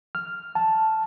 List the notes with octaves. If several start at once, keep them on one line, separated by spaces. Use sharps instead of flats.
F6
A5